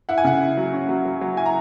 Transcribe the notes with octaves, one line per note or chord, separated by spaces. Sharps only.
E4 F#5
G#5
C#3 F#5
E4
F#3
C#4
F#3
F#3
F#3
E4 G#5
A#5